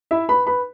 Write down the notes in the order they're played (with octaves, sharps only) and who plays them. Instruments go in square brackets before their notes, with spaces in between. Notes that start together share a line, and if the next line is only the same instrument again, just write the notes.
[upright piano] E4 E5
B4 B5
B4 B5